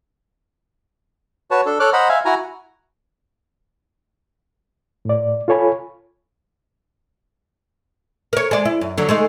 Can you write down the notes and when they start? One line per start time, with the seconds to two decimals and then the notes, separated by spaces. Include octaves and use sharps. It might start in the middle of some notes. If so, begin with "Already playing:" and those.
1.51 F#4 B4 C#5 A5
1.66 D4 A4
1.80 A4 C#5 D6 F6 F#6
1.93 C5 D#5 F#5 A#5 B5
2.09 E5 F5 G#5
2.25 E4 F#4 G#5 A#5
5.05 A2 D5
5.48 F4 A4 C#5 G#5 B5
8.33 A#4 C#5
8.51 G#3 D5
8.65 E4
8.81 F#2
8.98 D3 F#3
9.09 G#3 A3 D#4